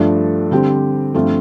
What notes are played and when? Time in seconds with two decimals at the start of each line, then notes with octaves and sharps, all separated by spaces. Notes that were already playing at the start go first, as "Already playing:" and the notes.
Already playing: G2 F3 A3 D4 A4
0.51 D3 G3 C4 G4 C5
1.14 G2 F3 A3 C4 F4